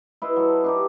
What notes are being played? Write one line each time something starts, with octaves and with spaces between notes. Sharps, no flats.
E4 B4 D#5 C6
F#3 A4
D4 D#4 G4